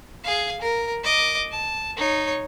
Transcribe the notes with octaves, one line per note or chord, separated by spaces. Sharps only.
G#4 F5
A#4
D#5 D6
A5
D#4 C#5